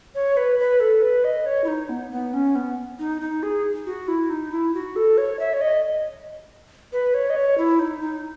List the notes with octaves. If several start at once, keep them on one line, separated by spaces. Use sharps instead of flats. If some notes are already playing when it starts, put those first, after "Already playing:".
C#5
B4
B4
A4
B4
D#5
C#5
E4
D#4
B3
B3
C#4
B3
D#4
D#4
G#4
F#4
E4
D#4
E4
F#4
A4
C#5
E5
C#5
D#5
B4
C#5
D#5
C#5
E4
D#4
D#4